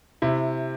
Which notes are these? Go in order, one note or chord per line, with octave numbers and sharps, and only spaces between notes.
C3 E4